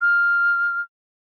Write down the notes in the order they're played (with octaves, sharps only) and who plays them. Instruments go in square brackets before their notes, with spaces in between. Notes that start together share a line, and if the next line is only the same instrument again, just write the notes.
[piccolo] F6